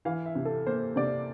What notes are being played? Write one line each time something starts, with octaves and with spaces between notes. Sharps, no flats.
E3 F5
E5
C3
A4
A#3 C5
C3 D5